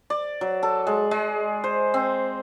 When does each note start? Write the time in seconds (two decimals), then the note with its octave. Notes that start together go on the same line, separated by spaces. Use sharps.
0.10 D5
0.41 F#3
0.63 A4
0.87 G#3
1.11 G#3
1.64 C5
1.94 C4